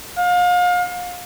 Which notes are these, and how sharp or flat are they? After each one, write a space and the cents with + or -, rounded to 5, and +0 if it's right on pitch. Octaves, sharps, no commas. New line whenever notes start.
F5 +35